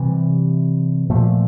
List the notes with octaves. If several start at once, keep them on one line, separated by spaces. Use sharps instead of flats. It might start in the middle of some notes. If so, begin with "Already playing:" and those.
Already playing: C3 E3 G3
A#2 F3 A3